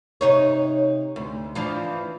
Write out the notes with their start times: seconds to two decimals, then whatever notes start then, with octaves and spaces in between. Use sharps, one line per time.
0.21 C3 D#4 C#5
1.16 D2
1.55 E3 F3 D4